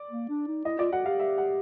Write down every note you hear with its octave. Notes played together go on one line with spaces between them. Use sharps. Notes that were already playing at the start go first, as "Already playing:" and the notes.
Already playing: D5
A#3
D4
D#4
E4 D#5
F4 D5
F#4 F#5
G4 F5
E5
F#5